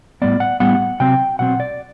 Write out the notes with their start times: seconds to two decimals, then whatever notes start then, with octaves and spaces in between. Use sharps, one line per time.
0.22 A2 G3 B3 D5
0.40 F#5
0.60 A2 G3 B3 F#5
1.00 C3 F#3 C4 G5
1.39 B2 F#3 C4 F#5
1.60 D5